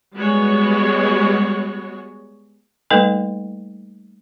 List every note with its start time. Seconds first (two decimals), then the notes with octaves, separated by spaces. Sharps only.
0.15 G3 G#3 B3 F#4 G#4 C#5
2.90 G3 A3 A#3 D#4 A4 B4